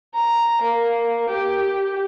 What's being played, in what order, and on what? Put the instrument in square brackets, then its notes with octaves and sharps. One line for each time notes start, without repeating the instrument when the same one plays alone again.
[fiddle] A#5
A#3
G4